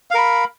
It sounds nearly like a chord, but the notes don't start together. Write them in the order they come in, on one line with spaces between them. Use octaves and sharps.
F5 A#4 B5